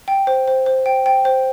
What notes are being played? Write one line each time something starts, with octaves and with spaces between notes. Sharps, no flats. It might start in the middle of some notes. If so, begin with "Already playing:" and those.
G5
C5
C5
C5
G5
G5
C5